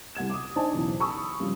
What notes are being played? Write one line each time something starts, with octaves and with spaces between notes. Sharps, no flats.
C2 F#5 G#6 E7
D6 D#6
D4 D#4 C5 D5 G#5 A5
B1 E2 C#3
G#5 A5 B5 C#6 D#6 E6
G2 C#3 F3